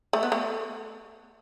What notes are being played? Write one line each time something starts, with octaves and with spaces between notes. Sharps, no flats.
A3
B3
A3